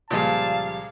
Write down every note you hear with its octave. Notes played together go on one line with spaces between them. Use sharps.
C#2 A#2 F3 G3 G#4 F5 A5